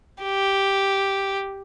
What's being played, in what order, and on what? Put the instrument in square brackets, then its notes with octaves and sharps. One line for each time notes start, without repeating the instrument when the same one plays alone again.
[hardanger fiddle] G4